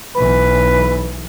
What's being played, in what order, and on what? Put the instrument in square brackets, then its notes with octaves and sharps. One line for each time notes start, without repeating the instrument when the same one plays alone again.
[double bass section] B1 E3 [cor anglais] B4